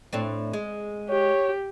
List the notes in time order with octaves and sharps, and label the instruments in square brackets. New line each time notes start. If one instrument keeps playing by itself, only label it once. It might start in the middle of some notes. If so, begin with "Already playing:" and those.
[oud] A2 C4 D4
G#3
[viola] G4 [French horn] C#5